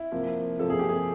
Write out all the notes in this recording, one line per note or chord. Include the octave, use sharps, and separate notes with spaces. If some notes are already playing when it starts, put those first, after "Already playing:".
Already playing: E4
C3 F3 A#3
C3 F3 A#3 A4
G#4
G4
G#4